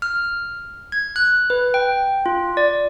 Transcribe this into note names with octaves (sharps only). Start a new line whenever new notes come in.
F6
G#6
F#6
B4
G5
F4
D5